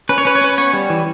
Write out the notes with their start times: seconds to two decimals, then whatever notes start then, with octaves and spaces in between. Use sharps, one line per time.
0.09 C#4 B4
0.18 C#5
0.25 C#4 B4
0.35 C#5
0.41 C#4 B4
0.58 B3 C#5
0.73 G3
0.90 E3